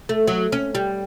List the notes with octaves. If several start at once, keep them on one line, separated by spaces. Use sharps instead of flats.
A3
F#3
C#4
G3